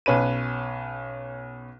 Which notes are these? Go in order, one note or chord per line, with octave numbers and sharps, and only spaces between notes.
B1 C#4 B4 D#7